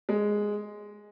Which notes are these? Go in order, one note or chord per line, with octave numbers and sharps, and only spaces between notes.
G#3